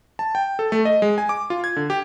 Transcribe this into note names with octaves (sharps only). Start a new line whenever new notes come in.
A5
G5
A4
A3
D#5
G#3
G#5
D6
F4
G#6
D3
G4